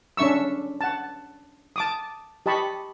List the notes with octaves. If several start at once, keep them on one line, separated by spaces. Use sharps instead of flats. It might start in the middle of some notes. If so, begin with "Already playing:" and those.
C#4 D4 E5 C#6 E6
F#5 A5
A5 D6 D#6
G4 D#5 A5 B5 C#6